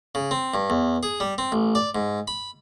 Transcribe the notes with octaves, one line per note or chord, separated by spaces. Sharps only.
C#3
C4
G2
E2
G#4
G3
C4
A1
D5
G#2
B5